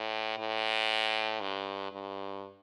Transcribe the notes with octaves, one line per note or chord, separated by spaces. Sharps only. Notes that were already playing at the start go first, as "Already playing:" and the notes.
Already playing: A2
A2
G2
G2